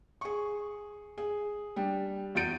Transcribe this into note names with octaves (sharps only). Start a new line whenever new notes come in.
G#4 C#6
G#4
G3 D4
E2 F#4 G6 A6 D7 D#7